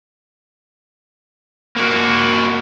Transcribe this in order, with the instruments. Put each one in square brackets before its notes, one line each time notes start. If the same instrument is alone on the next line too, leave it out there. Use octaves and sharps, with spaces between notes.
[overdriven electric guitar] A#3 F#4